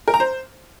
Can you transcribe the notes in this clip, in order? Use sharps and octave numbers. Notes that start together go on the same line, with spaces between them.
A#4
A#5
C5